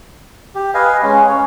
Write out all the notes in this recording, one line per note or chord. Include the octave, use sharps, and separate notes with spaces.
G4
B4 D#5 F5 G#5
G#3 C#4
C#5